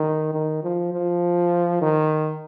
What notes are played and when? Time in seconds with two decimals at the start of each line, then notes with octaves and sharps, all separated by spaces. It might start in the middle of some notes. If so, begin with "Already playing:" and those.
Already playing: D#3
0.33 D#3
0.63 F3
0.93 F3
1.81 D#3